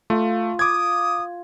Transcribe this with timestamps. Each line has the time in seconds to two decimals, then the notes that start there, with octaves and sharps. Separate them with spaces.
0.10 A3 F4
0.59 D6 D#6 G#6